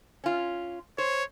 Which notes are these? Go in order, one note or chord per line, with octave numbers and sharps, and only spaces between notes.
C#4 F4
C5 C#5